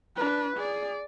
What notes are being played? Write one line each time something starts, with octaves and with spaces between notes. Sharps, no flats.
D4 B4
G#4 D5